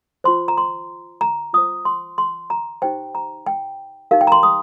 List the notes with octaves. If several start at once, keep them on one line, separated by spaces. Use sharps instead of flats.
F4 C5 C6
A#5
C6
A#5
F4 C5 D#6
C6
C6
A#5
D#4 G4 C5 G5
A#5
G5
D#4 G4 A#4 F5
G5
A#5
C6
D#6